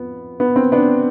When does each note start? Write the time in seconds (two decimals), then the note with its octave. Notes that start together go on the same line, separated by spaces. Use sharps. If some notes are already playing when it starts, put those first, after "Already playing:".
Already playing: F2 B3
0.40 B3
0.56 C4
0.72 B3 D4